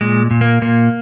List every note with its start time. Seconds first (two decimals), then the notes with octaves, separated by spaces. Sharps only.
0.01 A#2 G#3
0.31 A#2
0.41 A#3
0.62 A#2 A#3